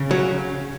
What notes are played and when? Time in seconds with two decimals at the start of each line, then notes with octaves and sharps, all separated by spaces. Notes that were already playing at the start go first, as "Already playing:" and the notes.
Already playing: C#3
0.11 F#3